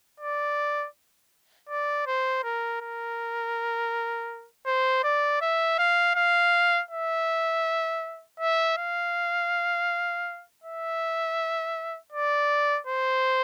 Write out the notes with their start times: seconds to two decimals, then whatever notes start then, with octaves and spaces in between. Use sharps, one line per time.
0.20 D5
1.69 D5
2.07 C5
2.44 A#4
2.81 A#4
4.66 C5
5.04 D5
5.41 E5
5.78 F5
6.15 F5
6.91 E5
8.40 E5
8.77 F5
10.64 E5
12.13 D5
12.87 C5